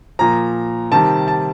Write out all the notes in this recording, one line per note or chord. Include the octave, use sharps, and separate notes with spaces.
A#2 F3 A#5
C3 D#3 G3 A5
A5